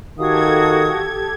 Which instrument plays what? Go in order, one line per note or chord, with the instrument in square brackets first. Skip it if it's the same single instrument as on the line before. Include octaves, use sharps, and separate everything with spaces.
[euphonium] D#3 [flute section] F#4 F5 D#6 [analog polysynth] G4 A4 G#6